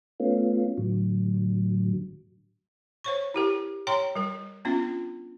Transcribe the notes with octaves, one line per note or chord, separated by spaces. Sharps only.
A3 B3 C#4 F4
A2 D3 F#3
C5 C#5 C#6
E4 G4 A#4
C#5 G5 A#5 C6
G3 A#4
B3 C#4 D4 F4